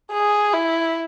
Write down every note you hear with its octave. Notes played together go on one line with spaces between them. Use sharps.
G#4
E4